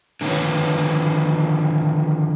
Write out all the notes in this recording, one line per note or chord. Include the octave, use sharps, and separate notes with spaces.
D3 D#3 F3 B4 C#5